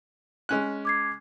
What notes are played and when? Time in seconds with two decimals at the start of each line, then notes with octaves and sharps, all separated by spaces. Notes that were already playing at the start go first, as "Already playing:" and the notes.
0.49 G#3 C#4 F#6
0.85 D6 G#6 C7